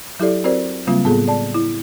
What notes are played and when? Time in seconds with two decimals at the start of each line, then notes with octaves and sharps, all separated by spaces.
0.20 F#3 E4 G4 A4 D5
0.44 C4 F#4 A#4 C5 D5
0.87 C#3 F#3 G3 A#3 C4 F4
1.04 A2 B3 F4 G#4 A4
1.28 D5 A5
1.54 E4